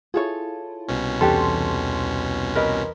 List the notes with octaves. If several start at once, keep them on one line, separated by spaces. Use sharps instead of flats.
E4 F4 G#4 A4 C#5
C2 B2 C#4
E2 E3 D4 G4 A4 C6
A#4 B4 D#5